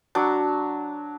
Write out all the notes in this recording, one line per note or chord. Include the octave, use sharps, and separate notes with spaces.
F#3 D4